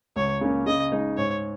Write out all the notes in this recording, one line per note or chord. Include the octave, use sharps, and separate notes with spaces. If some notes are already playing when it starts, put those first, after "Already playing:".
C#2 C#5
C#3 A#3 C#4
C#3 D#5
G#3 D#4
G#2 C#5